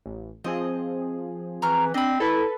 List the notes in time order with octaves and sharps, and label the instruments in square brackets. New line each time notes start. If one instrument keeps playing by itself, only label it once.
[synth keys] A1
[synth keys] F3 C4 G#4 [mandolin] D#5
[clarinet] E3 [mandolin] A#5 C#6 F6
[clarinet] C4 [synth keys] D4 [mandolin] D#5 B5
[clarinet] E4 [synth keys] A4 B4